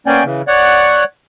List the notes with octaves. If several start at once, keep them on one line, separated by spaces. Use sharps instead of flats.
A#3 B3 C#4 D5 G5 G#5
C#3 E3
C#5 D5 F#5